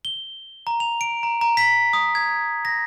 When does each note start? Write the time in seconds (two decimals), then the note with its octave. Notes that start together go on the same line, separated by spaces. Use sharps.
0.05 G7
0.67 A#5
0.80 F7
1.01 D7
1.23 A#5
1.41 A#5
1.57 B6
1.93 D#6
2.15 G#6
2.65 A#6